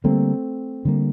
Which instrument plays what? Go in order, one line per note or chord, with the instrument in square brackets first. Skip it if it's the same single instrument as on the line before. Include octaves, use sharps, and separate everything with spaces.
[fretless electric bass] D3 G3 A#3 [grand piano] A3 C4
[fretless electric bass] D3 G3 A#3